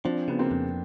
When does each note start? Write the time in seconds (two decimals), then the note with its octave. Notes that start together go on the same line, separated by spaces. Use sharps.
0.05 F3 C4 D4
0.28 C#3 B3
0.39 A#3 C4
0.51 F2